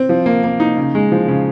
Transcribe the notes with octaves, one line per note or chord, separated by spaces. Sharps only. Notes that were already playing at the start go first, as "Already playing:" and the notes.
Already playing: C4
F3
A#3
A#3
D#4
C#3
G#3
F3
C#3